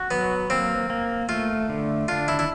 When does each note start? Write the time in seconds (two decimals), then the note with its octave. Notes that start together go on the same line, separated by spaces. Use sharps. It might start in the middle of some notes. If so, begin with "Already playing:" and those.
Already playing: F#4
0.11 F#3 B3
0.50 A#3 C4
0.90 A#3
1.29 A3 F4
1.69 D3
2.08 D4 F4
2.28 E4
2.39 E4